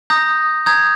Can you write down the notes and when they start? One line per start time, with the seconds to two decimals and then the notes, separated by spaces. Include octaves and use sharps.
0.10 A#5 D#6 G6 A#6
0.66 A#5 D#6 G6 G#6